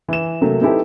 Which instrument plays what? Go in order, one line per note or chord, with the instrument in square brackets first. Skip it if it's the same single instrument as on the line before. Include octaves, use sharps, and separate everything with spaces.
[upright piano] E3 E7
C3 F#3 A3 A#3
C4 D#4 E4 G4 A4 B4